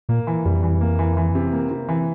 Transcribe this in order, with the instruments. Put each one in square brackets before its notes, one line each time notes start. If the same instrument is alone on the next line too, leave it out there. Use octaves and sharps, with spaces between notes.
[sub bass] A#2 [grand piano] A#3
[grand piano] E3
[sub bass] F2 [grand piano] G3
[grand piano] E3
A#3
E3
E3
C3
A#3
C3
E3